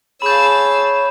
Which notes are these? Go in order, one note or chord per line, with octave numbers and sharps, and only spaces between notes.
G#4 C#5 F5 A5 B5 E6 G6